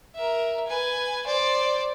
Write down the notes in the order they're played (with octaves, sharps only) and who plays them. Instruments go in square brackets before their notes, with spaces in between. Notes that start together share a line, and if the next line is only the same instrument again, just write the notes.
[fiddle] A#4 E5
B4 G#5
C5 D5